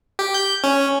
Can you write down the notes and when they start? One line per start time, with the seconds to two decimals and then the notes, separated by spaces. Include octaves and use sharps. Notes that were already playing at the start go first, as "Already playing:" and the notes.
0.19 G4
0.34 G6
0.64 C#4